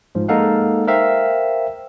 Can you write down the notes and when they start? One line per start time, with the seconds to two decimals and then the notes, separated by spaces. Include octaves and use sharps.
0.15 G#2 F3 G#3
0.28 G#3 A#3 D#4 A4 F5 F#5
0.87 A#4 C5 E5 F5 G5